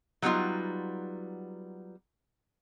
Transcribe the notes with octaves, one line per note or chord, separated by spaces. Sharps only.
F#3 G3 B3 D#4 F4